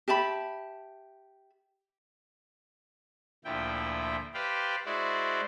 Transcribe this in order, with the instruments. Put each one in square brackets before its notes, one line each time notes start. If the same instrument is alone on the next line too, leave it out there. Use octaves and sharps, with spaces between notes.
[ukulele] G4 E5 A5 B5
[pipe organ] D2 A#2 F3 E4 G5
G4 B4 C5 D5 F5 G5
G#3 E4 F#4 C5 D5